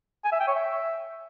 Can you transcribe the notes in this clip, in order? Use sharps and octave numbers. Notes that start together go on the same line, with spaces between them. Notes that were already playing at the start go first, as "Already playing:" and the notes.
G#5
E5
G5
C#5
E5